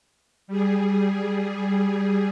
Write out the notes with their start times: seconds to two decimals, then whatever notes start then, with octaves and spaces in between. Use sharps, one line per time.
0.48 G3 G#4